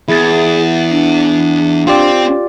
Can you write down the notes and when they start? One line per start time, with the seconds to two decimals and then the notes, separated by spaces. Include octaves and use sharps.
0.08 E2 E4 G#4 A6
0.90 D4
1.87 C4 F4 G4 D5